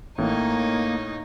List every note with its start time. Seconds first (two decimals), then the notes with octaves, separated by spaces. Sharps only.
0.18 A1 A2 A#3 D#4 C#5